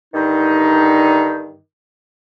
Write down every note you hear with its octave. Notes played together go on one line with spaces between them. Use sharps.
G2 D3 D#3 D#4